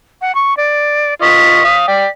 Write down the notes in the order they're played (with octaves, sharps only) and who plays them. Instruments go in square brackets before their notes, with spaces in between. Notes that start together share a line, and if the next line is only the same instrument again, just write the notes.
[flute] F#5
C#6
D5
[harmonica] F4 D#5 C#6 [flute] B6
[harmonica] F5 D#6
[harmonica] D5 G5 [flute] B6